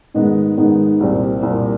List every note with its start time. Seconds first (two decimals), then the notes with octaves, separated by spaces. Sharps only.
0.14 G#2 D#3 G#3 B3 D#4
0.58 G#2 D#3 G#3 B3 D#4
1.00 C2 A#2 G3 C4
1.43 C2 A#2 G3 C4